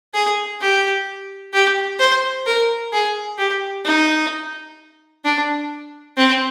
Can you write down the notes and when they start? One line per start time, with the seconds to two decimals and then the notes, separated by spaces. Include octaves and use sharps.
0.14 G#4
0.61 G4
1.53 G4
1.99 C5
2.46 A#4
2.92 G#4
3.38 G4
3.85 D#4
5.24 D4
6.17 C4